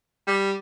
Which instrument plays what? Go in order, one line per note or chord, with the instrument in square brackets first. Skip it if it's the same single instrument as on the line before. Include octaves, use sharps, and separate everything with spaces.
[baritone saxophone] G3